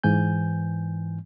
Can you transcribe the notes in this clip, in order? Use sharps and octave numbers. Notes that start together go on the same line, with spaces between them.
G#2 E3 G#5 G6